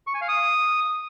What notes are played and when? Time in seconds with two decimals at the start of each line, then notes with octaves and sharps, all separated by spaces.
0.07 C#6
0.14 G#5
0.21 F5
0.28 D#6